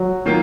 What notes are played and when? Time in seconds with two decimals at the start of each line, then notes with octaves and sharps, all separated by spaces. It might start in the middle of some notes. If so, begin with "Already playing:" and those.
Already playing: F#3
0.25 D#3 A#3 F4